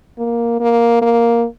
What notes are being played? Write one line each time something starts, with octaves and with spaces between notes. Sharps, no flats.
A#3
A#3
A#3